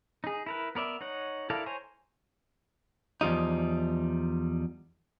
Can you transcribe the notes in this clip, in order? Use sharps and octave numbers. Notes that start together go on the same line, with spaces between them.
D#4 G#4
E4 A#4 B4
B3 A#4 D5 E5
D#4 C#5 F#5
E4 A4 A#4 D5 F5
C5 C#5 G#5 A#5
E2 F3 G3 D#4